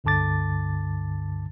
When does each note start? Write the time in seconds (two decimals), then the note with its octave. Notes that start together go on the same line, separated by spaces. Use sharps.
0.04 C#2 G2 D3 A5 D6 A6